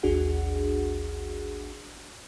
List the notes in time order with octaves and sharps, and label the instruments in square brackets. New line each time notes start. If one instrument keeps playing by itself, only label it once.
[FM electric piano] A1 D#2 D4 F#4 G#4 F#5